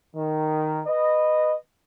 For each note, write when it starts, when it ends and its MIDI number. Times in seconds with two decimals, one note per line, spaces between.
0.16 0.81 51
0.86 1.54 71
0.86 1.54 75